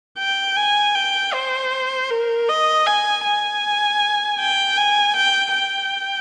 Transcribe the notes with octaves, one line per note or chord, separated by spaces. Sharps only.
G5
G#5
G5
C5
A#4
D#5
G#5
G#5
G5
G#5
G5
G5